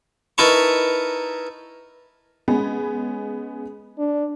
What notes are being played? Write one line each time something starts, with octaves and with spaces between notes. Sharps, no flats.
D#4 E4 A#4 B4 A5 C#6
G#3 B3 C#4
D4